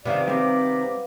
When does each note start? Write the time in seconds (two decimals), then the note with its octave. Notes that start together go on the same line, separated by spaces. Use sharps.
0.05 C3 D#3 B3 E4 C#5 D5 F5
0.28 G3 C4 A#5 B5 D6